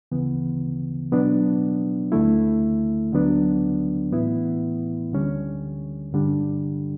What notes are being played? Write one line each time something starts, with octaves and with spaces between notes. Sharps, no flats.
D2 C#3 E3 B3
B2 F#3 B3 D4
D2 D3 A3 E4
D2 D3 F#3 B3 D4
A2 E3 B3 E4
D2 D3 G3 C#4
G2 D3 G3 D4